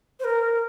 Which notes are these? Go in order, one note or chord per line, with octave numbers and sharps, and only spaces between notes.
C5
A#4
A#4